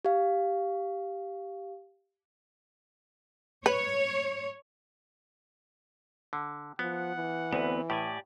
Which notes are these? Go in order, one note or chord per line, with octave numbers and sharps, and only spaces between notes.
G4 F5
B4 C#5
D3
F3 B3 F#5
E3
D2 B3 C4 B4
A2 G4 D5 G#5